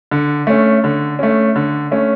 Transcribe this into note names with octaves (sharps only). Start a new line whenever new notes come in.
D3
A3 C#4
D3
A3 C#4
D3
A3 C#4